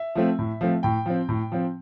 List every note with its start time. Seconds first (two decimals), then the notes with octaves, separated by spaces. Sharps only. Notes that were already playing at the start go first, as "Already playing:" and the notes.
Already playing: E5
0.15 F3 A3 C4
0.39 A2
0.61 F3 A3 C4
0.83 A2 G5
1.06 F3 C4
1.29 A2
1.52 F3 C4